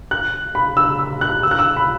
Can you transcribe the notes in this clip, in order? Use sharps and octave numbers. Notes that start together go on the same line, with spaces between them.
F#6
B5
E6
E6
F#6
E6
F#6
E6
B5